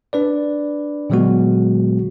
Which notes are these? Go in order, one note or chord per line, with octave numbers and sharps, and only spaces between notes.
D4 B4 D5
A#2 D3 F#3 G#3 B3 F#4